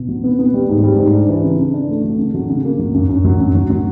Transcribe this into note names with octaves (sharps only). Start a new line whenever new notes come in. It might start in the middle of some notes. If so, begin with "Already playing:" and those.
Already playing: B2
F#3
B3
B3
G3
G#2
G3
G#2
D4
E3
C#3
C#3
D4
A3
F#3
C#3
F#3
C#3
A#3
F#3
F#2
F#2
F#3
F#2
F#3
F#3